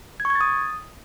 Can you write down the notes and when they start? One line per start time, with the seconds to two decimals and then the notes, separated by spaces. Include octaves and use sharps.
0.20 G#6
0.25 C#6
0.30 G#6
0.35 A6
0.41 D#6